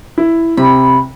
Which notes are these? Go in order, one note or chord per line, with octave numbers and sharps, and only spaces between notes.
E4
C3 B5